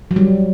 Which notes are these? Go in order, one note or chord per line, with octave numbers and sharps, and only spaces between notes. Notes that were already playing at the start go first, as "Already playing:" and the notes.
F#3
G3